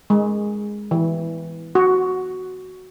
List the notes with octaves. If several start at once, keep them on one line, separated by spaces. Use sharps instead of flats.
G#3
E3
F#4